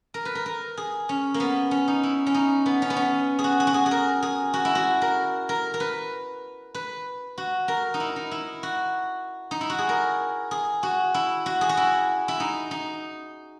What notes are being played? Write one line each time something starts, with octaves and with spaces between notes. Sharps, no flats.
A#4
B4
A#4
A#4
G#4
C#4
A#3
B3
C#4
D#4
E4
C#4
D#4
B3
C#4
B3
C#4
G#4
F#4
G#4
F#4
G#4
G#4
A#4
G#4
F#4
E4
F#4
A#4
A#4
A#4
B4
B4
F#4
A#4
D#4
E4
D#4
E4
F#4
D#4
E4
F#4
G#4
A#4
G#4
F#4
E4
F#4
G#4
F#4
E4
E4
D#4
D#4